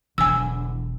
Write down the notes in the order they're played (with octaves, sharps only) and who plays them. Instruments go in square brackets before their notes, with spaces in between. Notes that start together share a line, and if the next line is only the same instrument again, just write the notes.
[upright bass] E1 [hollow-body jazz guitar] D3 E3 F#3 [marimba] G#5 E6